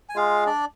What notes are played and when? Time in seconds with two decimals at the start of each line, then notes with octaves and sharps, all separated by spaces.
0.09 G#5
0.16 G#3 F4 F5
0.47 D4 D5